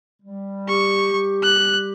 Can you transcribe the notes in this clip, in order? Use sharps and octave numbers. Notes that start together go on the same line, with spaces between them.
G3
G4 C#6
G3
F#6
G4